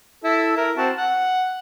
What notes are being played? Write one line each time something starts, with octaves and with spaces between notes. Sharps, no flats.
E4 A4
E4 A#4
C4 F#4 A5
F#5